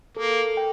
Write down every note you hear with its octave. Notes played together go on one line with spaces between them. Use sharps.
A#3 A4
G5